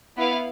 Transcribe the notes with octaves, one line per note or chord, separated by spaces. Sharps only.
B3 E4 B4 F5